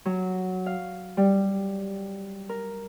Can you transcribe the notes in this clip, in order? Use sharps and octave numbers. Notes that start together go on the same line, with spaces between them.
F#3
F5
G3
A#4